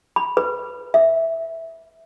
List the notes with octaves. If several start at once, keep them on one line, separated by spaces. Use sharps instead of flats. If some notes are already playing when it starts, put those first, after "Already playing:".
B5
B4
E5